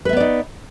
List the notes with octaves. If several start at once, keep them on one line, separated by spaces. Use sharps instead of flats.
B3 D#4 B4 D5 E5